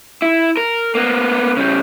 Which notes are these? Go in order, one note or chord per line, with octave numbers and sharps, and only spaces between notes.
E4
A#4
A#3 B3
C#3 G3